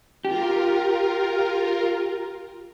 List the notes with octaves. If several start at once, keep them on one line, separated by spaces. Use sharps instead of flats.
F4 G4 A#4